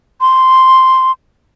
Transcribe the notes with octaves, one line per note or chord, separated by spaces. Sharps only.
C6